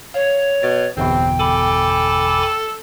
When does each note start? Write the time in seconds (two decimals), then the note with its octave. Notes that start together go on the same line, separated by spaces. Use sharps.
0.14 C#5 F5
0.63 B2 A6
0.97 G1 E2 B2 C4 G5
1.39 A4 G#5 B5 D6